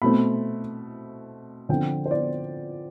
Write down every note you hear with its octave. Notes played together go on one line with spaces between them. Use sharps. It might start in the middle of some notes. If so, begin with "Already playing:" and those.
B2 A3 C4 B5
D3 F3 C4 G5
C5
D5